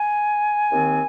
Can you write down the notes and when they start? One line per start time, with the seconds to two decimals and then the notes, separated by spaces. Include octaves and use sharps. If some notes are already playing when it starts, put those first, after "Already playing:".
Already playing: G#5
0.70 D#2 D#3 C4